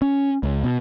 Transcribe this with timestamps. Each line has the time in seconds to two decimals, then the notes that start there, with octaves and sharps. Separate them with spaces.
0.02 C#4
0.43 C#2
0.64 B2